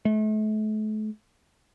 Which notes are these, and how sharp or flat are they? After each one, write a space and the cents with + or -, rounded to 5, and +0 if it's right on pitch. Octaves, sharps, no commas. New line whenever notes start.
A3 -40